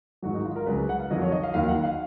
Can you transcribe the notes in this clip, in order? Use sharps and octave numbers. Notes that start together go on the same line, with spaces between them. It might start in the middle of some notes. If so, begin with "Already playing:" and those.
G#2 D#3 F#3 F#4
D#4
F4
A#4
C#2 C#3 F#3 B4
B4
F#5
F5
F2 D#3 F#3 D#5
C#5
D#5
F5
D#2 D#3 F#3 F5
F#5
F5